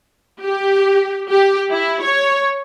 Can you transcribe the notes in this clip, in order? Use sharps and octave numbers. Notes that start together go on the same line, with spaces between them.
G4
G4
E4
C#5